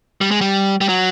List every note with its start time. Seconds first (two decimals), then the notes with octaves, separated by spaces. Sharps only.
0.21 G3
0.31 G#3
0.41 G3
0.81 G3
0.89 F#3